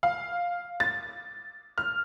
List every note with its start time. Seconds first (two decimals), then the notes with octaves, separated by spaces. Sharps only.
0.03 F5
0.80 A6
1.78 F6